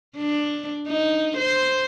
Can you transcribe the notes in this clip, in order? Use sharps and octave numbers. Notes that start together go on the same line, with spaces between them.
D4
D#4
C5